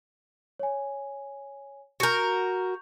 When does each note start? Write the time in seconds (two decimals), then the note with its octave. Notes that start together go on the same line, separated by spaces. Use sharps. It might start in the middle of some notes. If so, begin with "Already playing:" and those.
0.59 C#5 G#5
2.00 F#4 A#4 C#6 G6